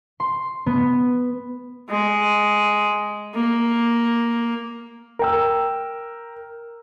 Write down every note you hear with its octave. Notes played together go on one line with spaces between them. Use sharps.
C6
B3
G#3
A#3
A#4 G5 E6